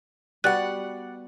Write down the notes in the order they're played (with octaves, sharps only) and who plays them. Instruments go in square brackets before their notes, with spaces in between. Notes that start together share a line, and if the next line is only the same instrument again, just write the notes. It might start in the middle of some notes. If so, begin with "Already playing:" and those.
[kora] G3 B3 F#4 [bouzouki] D5 F#5 [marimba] F#6